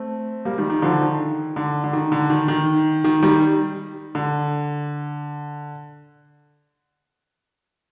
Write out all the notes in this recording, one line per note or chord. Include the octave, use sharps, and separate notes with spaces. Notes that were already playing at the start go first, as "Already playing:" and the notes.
Already playing: A3 C4
G3 A#3
D#3 G3
D#3
D3 F3
D#3
D3
D3
D#3
D3
D#3
D#3
D#3
D#3 G3
D3